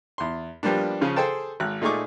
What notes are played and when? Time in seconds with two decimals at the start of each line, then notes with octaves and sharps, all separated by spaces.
0.18 E2 C6
0.63 F3 G3 A#3 B3 D4
1.01 C#3 F3 C#4
1.16 G#4 A4 C5 G5 A5
1.60 G#1 F#6
1.82 A#2 A3 D#4 G#4 C#6 D6